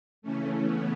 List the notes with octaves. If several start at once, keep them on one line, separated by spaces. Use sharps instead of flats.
C#3 E3 A3 C#4
B3